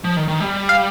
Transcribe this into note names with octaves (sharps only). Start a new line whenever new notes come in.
F3
D#3
D#3
G3
F5